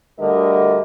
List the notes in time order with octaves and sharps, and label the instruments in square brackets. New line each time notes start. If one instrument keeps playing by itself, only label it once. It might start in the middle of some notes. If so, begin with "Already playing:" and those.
[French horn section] D2 D3 G3 A#4 D#5